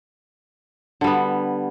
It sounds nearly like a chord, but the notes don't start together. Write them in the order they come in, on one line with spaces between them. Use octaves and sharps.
D3 G3 B3